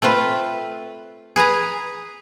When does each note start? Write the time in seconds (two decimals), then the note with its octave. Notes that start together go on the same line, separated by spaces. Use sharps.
0.02 A3 C4 F4 B4
1.36 G#4 B4 G#5 A#5